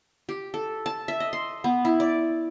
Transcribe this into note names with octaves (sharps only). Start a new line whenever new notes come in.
G4
A4
A5
E5
D#5
C6
B3
E4
D5